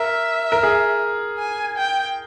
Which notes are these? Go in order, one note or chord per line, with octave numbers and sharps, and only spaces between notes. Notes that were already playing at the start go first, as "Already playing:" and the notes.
Already playing: A#4 E5
A#4
G#4
G#5
G5